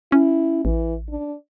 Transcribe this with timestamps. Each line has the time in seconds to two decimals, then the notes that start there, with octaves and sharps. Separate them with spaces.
0.12 C#4 E4
0.65 A1 E3
1.10 D4